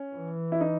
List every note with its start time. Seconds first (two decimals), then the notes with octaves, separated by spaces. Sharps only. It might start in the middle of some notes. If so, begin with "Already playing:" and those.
Already playing: C#4
0.15 E3
0.52 E4
0.61 D#4